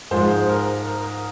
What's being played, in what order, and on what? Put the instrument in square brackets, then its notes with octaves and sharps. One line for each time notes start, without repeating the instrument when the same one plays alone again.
[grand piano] G#2 F3 G#3 C5
A#4
A#4